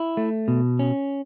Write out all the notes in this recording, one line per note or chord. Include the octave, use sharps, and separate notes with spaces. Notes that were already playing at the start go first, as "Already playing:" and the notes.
Already playing: E4
A3
B2
C#4